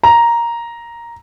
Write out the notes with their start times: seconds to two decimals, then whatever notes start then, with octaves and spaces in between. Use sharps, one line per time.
0.03 A#5